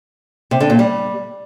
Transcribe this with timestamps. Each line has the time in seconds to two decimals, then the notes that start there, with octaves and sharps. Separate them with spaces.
0.51 C3
0.60 D3
0.70 A#2
0.79 G3